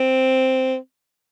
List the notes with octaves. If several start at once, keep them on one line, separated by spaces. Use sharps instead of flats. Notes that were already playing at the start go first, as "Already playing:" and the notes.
Already playing: C4